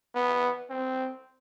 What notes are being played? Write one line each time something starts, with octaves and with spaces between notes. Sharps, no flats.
B3
C4